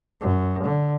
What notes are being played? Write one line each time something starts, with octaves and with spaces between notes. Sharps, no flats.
F#2
D3